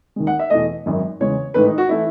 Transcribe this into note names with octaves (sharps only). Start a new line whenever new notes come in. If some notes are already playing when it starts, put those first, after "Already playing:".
D#2 D#3 G#3
F#5
E5
E2 B2 A3 D#5
G#1 F#2 D#3 G#3
E2 C#3 G#3 C#5
A1 G#2 D#3 A3 B4
D#4
F#4
E3 A3 E4